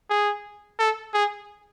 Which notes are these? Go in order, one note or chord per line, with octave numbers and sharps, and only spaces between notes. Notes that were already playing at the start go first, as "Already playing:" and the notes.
G#4
A4
G#4